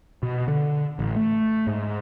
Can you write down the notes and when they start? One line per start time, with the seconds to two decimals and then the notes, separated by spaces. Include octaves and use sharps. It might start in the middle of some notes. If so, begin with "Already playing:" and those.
0.23 B2
0.48 D3
0.99 A1
1.16 A3
1.67 G#2